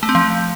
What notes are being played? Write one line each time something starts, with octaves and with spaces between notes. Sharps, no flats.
A3
C4
F3